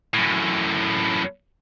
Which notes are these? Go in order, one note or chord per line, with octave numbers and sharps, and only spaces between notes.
F#2 A2